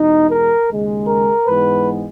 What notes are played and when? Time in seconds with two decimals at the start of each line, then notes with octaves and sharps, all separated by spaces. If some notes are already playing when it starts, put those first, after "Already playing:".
Already playing: E2 B2 G#3 D#4
0.29 A#4
0.69 D#2 C#3 G#3
1.08 A#4
1.46 G#2 E3 G#3 B3 B4